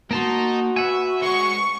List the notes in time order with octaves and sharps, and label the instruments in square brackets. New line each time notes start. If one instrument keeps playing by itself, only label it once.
[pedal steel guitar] A#3 A5 C6 [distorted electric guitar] D#4 [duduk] F#4
[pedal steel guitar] B4 F#5 G#5 [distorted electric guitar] E5
[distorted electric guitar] G#3 [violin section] C#6